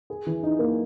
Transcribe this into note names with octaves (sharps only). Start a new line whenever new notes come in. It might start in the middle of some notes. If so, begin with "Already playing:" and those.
G#4
E3
D#4
A#3